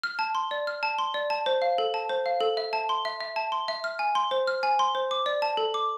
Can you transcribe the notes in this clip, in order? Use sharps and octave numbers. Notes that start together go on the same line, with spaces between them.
F6
A5
C6
D5
F6
A5
C6
D5
A5
C5
F5
A4
A5
C5
F5
A4
E5
A5
C6
E5
E5
A5
C6
E5
F6
G#5
C6
C5
F6
G#5
C6
C5
D6
D5
A5
A4
D6